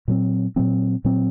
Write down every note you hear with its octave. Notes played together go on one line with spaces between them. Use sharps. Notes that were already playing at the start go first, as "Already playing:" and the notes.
A#2 F#3 C4
A#2 F#3 C4
A#2 F#3 C4